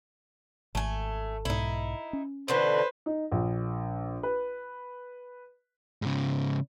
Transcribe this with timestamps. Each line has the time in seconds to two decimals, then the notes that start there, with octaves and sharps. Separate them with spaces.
0.75 G#1 A3 G#5
1.45 B1 G#2 D#4 E4
2.13 C#4
2.48 B2 D3 E3 B4 C5
3.06 D#4
3.32 A#1
4.23 B4
6.02 G#2 C#3